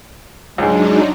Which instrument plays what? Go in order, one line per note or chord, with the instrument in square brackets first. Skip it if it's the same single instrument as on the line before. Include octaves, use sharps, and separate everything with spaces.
[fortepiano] C#2 G#2 [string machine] F#3 D4 D#4 [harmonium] G#3